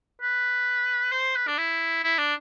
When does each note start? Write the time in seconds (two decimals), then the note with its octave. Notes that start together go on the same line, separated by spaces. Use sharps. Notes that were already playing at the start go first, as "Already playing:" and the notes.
0.22 B4
1.12 C5
1.36 B4
1.47 D4
1.58 E4
2.04 E4
2.18 D4